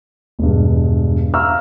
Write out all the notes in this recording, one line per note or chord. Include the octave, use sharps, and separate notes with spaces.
E1 G2
E5 F5 A#5 C#6 E6 F6